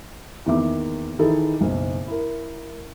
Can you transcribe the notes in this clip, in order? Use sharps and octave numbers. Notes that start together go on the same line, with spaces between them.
E2 D#3 A#3 E5 D6
D#3 E3 D#4 E4 G#4 A4
F#1 B1
E4 A#4